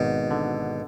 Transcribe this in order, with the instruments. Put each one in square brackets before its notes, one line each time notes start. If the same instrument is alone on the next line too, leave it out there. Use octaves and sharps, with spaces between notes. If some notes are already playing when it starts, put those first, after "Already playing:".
Already playing: [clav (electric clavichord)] G#1 [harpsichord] B2
[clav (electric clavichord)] D3